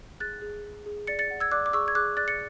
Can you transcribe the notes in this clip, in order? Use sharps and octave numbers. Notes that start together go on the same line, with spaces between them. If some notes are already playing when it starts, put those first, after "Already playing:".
G#4 F#6 A6
G#4
G#4
G#4
D5 A6 C#7
A6 C#7
F#5
E6 G#6
D5 D6 F#6
D6
G#4 C#6 E6
G#6
G#4 D6 F#6
D5 F#6 A6
A6 C#7